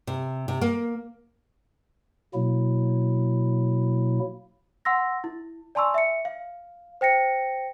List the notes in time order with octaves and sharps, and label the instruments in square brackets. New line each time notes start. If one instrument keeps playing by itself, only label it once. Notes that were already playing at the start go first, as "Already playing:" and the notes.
[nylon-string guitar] C3
C3
A#3
[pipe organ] B2 F#3 A#3 E4
[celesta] F#5 C6 E6 A#6
E4
D5 G#5 A5 C6 C#6 E6
E5 C#7
F5
C5 G5 A#6 C#7